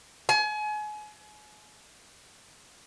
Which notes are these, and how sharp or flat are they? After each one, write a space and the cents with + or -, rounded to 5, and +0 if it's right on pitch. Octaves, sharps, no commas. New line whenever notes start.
G#5 +35